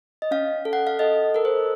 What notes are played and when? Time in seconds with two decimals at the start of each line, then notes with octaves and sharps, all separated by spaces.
0.22 D#5
0.31 C#4 F5
0.65 A4
0.73 F#5
0.87 F5
0.99 A4 D#5
1.34 A4 A#4
1.45 C5